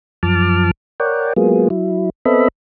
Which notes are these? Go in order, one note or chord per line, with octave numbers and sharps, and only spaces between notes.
F#2 F3 A5 D6 F6
A#4 C#5 D5 F#5 G5
F#3 G#3 A#3 B3 F4 G#4
F#3 E4
B3 C4 A4 D#5 E5 B5